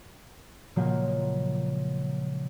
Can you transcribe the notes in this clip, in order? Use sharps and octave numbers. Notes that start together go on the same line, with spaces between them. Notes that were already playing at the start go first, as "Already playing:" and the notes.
A#2 C#3 F3 F#3 G#3 A#3